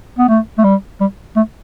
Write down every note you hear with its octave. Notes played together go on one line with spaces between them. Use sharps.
B3
A3
A3
G3
G3
A3